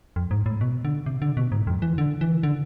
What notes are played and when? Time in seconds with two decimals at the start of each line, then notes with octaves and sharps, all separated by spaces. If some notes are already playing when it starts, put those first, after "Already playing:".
0.16 F2
0.31 G#2
0.46 A2
0.61 B2
0.85 D3
1.06 C3
1.22 D3
1.37 B2
1.52 G#2
1.67 F2
1.82 E3
1.98 D3
2.21 E3
2.43 D3